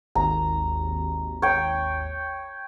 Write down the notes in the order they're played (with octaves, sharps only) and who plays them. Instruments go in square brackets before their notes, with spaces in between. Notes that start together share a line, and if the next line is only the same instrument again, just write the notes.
[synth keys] G#1 D#2 [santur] A#5
[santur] C#5 G5